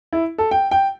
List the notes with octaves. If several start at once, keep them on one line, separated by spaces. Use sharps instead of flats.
E4
A4
G5
G5